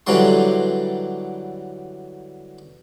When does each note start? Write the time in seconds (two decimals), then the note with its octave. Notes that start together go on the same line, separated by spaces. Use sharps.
0.07 D3 E3 F#3 G3 C6